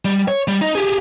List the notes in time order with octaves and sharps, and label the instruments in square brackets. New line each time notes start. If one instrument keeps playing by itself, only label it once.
[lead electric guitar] G3
C#5
G3
D#4
G4 G#4